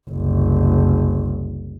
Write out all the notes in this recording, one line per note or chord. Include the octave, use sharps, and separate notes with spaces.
F#1 C2